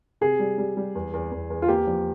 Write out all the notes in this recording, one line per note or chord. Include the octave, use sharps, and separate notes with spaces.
C3 G#4
G3
G3
G3
E2
E2
E2
E2
F4
A#3 G4
F3